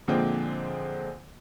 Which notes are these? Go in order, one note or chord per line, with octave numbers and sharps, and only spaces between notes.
A#2 D3 F3 G#3 A#3 C4